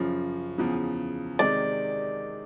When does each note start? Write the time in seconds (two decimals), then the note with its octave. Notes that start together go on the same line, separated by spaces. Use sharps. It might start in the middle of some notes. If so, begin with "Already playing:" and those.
Already playing: F#2 C#3 F3
0.58 E2 C#3 F3
1.39 C3 D#3 G#3 D5